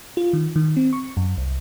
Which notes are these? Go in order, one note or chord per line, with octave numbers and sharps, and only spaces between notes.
F4
D#3
D#3
C4
C#6
F#2
C2